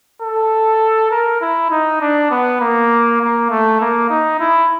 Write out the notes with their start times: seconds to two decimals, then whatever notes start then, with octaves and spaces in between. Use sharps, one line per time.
0.22 A4
1.11 A#4
1.41 E4
1.71 D#4
2.01 D4
2.31 B3
2.60 A#3
3.21 A#3
3.50 A3
3.81 A#3
4.10 D#4
4.40 E4